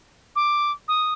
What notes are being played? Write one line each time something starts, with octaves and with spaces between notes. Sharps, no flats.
D6
D#6